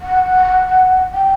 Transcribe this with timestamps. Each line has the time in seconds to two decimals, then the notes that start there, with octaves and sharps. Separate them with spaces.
0.01 F#5
1.13 G5